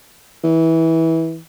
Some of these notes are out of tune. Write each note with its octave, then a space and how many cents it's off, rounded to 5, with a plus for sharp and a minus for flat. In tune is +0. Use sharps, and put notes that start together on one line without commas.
E3 -20